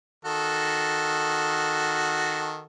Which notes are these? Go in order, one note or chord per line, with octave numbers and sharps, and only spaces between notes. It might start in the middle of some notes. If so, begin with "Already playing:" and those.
D#3 F#4 A4